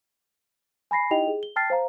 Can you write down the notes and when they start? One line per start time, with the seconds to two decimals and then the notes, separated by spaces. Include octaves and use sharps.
0.91 G#5 B5 A#6 C7
1.11 D#4 E4 G4 D#5 G5 F7
1.28 G#4
1.43 G7
1.56 G5 A5 F6 A6 C7
1.70 C5 F5 A#5